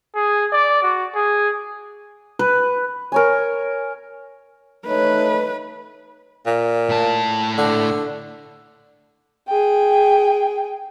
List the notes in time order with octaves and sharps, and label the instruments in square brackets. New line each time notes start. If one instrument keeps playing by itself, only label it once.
[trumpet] G#4
D5
F#4
G#4
[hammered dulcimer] B4
[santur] A#4 C#5 G#5
[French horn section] A3 D#4 C#5 [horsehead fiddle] B4
[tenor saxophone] A#2
[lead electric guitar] A2 A5
[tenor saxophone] D3
[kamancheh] G#4 G5